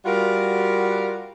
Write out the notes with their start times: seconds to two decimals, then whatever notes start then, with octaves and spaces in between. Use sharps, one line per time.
0.05 G3 F4 F#4 A#4